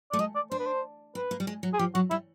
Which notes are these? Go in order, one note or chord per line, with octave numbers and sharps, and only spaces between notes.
A3 D5
G#3 D#5
D5
D4 C5
B4
C5
C4 B4
A#3
G3
G#3
F#3
G#4
F3 G4
F#3 F#4
G3 E4